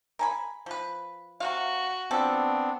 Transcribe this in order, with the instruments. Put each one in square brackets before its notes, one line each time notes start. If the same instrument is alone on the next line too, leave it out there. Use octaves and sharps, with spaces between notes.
[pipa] A#4 G#5 B5
F3 B4
[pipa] C3 C4 F5 [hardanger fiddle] F#4
[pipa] F3 A4 [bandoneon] B3 C4 D4